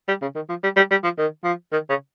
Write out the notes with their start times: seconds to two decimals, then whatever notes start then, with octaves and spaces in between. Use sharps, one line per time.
0.08 G3
0.22 C#3
0.35 D#3
0.49 F3
0.63 G3
0.76 G3
0.90 G3
1.03 F3
1.18 D#3
1.44 F3
1.72 D#3
1.89 C#3